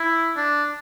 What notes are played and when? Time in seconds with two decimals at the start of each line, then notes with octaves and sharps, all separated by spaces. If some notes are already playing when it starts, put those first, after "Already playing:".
Already playing: E4
0.37 D4